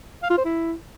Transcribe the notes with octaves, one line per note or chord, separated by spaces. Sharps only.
F5
F4
C5
E4